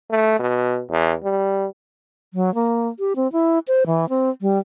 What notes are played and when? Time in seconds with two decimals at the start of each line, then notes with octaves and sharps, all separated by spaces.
0.10 A3
0.39 B2
0.91 E2
1.23 G3
2.34 F#3
2.55 A#3
2.99 G4
3.16 C4
3.32 E4
3.68 C5
3.87 E3
4.09 C4
4.41 G3